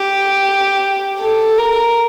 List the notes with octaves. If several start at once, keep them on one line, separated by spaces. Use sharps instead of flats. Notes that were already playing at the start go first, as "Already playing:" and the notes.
Already playing: G4
A4
A#4